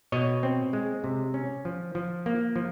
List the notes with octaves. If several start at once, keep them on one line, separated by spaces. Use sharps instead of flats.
B2 C#5 D#5
C4
G#3
C3
C#4
F3
F3
A#3
F3